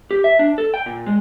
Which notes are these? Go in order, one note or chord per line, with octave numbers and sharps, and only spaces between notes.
G4
E5
D4
A4
G5
A#2
G#3